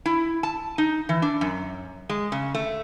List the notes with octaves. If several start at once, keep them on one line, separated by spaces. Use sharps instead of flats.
E4
A5
D#4
E3
D4
F#2
G#3
C#3
A3